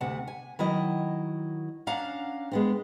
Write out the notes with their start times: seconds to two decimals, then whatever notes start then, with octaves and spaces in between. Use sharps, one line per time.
0.01 D2 C3 E5 F#5 A5
0.27 G#5
0.59 D#3 F#3 E4 D#5
1.87 C#4 D4 F5 F#5 A#5
2.51 G#3 B3 C4